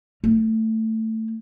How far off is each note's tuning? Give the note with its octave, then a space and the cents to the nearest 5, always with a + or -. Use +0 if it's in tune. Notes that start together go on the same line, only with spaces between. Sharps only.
A3 +15